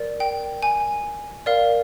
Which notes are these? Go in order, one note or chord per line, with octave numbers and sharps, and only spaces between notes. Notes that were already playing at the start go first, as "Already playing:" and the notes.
Already playing: A#4 D5
G5
G#5
A#4 D5 F5